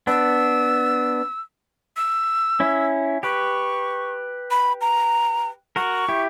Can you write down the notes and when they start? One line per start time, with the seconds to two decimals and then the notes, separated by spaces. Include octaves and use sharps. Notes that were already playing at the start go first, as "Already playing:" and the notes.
0.07 B3 D4 E6
1.97 E6
2.60 C#4 E4
3.23 G4 B4 C#6
4.51 B5
4.81 A#5
5.76 F#4 A#4 C#6
6.08 E4 G4